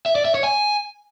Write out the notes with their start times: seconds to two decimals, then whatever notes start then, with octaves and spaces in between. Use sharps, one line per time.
0.06 E5
0.15 D5
0.25 E5
0.35 C#5
0.44 G#5